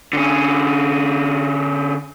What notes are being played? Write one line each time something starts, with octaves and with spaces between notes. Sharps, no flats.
D3 C#4